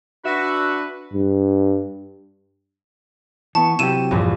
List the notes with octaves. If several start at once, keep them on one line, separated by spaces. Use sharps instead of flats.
D4 F#4 B4 E5
G2
E3 B3 A5 C#6
C3 F#3 E4 G4 D#7 E7
A#1 E2 G2